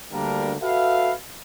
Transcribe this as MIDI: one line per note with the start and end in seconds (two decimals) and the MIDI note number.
0.12 0.55 38
0.12 0.55 50
0.12 0.55 55
0.12 0.55 58
0.12 0.55 62
0.12 0.55 70
0.61 1.13 66
0.61 1.13 69
0.61 1.13 71
0.61 1.13 76
0.61 1.13 77